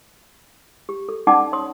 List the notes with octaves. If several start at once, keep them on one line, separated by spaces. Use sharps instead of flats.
G4
A4
C#4 D#4 D5 F#5 A5 D6
C#5 A5 C6 D#6